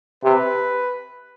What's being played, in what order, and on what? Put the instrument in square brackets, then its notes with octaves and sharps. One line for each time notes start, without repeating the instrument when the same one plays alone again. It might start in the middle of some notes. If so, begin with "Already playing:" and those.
[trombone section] C3 [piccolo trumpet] B4